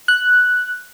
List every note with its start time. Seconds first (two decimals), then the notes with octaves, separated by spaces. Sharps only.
0.08 F#6